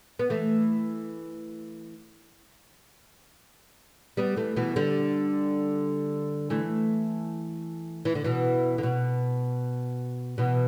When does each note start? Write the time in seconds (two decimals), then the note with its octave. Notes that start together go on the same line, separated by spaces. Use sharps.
0.19 B3
0.30 E3 A3
4.17 G3 B3
4.36 E3 A3
4.56 B2 E3
4.76 D3 G3
6.50 E3 A3
8.05 E3
8.15 D3
8.24 B2 E3
8.78 D3
8.83 B2
10.38 B2 E3